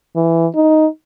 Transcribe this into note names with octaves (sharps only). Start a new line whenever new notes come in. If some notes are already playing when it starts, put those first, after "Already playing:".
E3
D#4